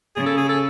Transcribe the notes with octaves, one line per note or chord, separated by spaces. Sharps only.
C#3 G#4
A4
G#4
A4